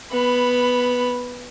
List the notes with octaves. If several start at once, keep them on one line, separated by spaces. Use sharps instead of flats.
B3 B5